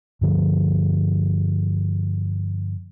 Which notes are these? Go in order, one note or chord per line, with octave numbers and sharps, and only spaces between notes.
G2 D3 F3